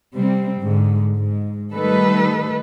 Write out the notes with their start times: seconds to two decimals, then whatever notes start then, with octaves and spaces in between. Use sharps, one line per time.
0.15 C3 G3 C4
0.60 G#2 D3
1.16 G#2
1.73 D#3 G3 A3 D#4 A4 B4